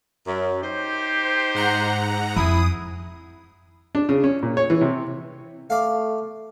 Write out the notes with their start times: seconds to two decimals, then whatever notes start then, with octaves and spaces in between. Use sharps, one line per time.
0.26 F#2
0.62 D#4 G4 C5
1.55 G#2 F#5 A#5
2.36 F2 E4 G#4 D#6
3.95 D4
4.09 C#3
4.24 C#4
4.43 A#2
4.57 C#5
4.70 E3
4.81 C3
5.70 A3 D5 F5